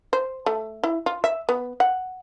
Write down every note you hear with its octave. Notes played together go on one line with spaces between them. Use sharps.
C5
A3
E4
F4
E5
B3
F#5